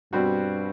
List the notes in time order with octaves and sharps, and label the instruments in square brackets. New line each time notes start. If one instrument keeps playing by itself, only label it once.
[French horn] G2 [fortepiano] B2 G3 C4 F#4